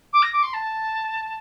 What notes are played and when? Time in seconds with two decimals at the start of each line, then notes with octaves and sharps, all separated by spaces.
0.13 D6
0.23 A#6
0.33 D6
0.43 C6
0.54 A5